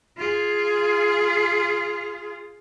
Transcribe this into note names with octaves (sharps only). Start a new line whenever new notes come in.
F4 G#4